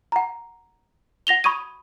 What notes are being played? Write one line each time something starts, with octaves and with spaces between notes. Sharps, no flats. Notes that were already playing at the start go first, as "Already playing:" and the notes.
F#5 A#5
F#5 A#6 F7 G7
B5 C#6 D#6 G#6 D#7